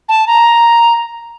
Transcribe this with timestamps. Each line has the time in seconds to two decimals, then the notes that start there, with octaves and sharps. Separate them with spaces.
0.09 A5
0.27 A#5